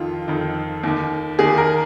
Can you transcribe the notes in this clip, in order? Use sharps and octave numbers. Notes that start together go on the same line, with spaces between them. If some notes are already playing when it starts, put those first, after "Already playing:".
Already playing: F2 D#3 F4
F2 D#3
D#2 D#3
D#2 D#3 G#4
A#4